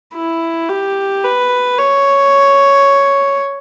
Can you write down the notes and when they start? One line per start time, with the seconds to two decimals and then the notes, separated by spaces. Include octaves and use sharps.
0.14 E4
0.69 G4
1.24 B4
1.79 C#5